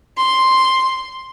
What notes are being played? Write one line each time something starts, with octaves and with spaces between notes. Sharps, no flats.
C6